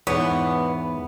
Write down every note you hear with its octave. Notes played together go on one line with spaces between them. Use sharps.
E2 G#2 B3 C#5